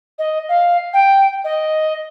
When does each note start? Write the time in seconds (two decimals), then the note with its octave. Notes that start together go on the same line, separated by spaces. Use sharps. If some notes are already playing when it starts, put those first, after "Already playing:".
0.18 D#5
0.49 F5
0.93 G5
1.44 D#5